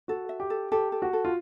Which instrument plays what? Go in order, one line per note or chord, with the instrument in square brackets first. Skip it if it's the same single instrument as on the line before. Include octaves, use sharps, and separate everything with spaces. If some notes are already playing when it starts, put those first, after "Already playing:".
[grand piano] F#4 [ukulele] A4
[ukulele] E5
[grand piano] G4
[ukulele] A4
[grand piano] G4 [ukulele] A4
[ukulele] A4
[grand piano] F#4
[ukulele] A4
[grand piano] F4